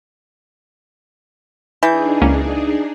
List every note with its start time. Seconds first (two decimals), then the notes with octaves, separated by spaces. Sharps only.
1.83 E3 D4 D#4 G#4 G6
2.22 C#2 A#3 C#4